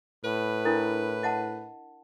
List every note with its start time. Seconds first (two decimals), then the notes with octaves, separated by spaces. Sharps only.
0.24 A2 B4
0.65 D4 E4 A#4
1.23 D#5 F#5 A5